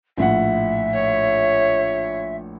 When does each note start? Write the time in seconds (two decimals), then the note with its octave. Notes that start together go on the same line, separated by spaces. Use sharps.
0.18 A#1 A2 E5 F#5
0.94 C#5